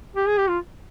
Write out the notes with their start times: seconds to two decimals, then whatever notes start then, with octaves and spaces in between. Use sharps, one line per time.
0.16 G4
0.28 G#4
0.38 G4
0.48 F4